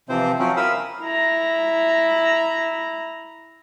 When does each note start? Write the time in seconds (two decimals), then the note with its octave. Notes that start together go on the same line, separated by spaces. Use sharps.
0.09 C3 E3 F3 C4 C5
0.39 F3 F#3 C4 C#4
0.57 E4 A#4 F5 B5 D#6 E6
1.01 E4 A#5